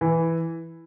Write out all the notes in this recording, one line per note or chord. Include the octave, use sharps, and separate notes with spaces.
E3